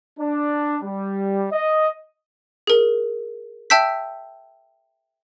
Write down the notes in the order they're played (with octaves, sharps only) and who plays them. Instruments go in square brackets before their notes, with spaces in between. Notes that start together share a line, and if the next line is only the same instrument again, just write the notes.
[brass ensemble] D4
G3
D#5
[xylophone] G#4 A#4
E5 G5 A5 E6 G6 B6